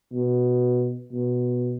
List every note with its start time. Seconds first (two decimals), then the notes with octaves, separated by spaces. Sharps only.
0.12 B2
1.12 B2